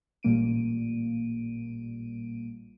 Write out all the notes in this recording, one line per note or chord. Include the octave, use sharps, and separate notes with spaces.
A1 A#2 G3 A#3 D7 D#7